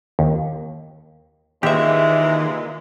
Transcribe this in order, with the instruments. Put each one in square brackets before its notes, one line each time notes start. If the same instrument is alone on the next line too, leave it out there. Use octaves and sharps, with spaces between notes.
[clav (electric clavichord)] D#2
[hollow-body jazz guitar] D#2 E5 [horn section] A#2 E3 G#3 [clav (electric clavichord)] G4